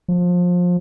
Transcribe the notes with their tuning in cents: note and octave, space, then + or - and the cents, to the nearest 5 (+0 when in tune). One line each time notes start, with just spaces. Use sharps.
F3 +25